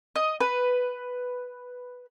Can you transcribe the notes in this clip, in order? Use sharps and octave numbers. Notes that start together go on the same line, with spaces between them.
D#5
B4